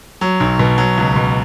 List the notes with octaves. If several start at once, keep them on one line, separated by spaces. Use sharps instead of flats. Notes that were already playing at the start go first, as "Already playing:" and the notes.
F#3
B1
B2
F#3
C#2
B2